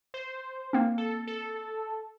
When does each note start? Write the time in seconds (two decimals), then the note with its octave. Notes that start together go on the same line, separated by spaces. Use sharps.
0.14 C5
0.73 A#3 C4
0.98 A4
1.27 A4